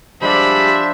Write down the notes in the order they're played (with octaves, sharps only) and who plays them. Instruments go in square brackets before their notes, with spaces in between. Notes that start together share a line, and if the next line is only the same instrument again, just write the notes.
[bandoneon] F3 D4 C5 [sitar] G3 G#3 [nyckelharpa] D5 B5 [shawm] E5